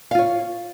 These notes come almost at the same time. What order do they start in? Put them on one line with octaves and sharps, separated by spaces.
F5 F4 C#5